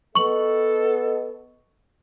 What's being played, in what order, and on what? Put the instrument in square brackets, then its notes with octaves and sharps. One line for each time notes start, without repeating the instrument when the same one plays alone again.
[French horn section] B3 D#5 [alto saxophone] A4 [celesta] C#6 F#7